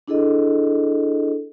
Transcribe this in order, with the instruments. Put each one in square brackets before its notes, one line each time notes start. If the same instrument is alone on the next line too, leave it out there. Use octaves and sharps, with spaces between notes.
[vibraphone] D4 E4 G#4 A4 D#5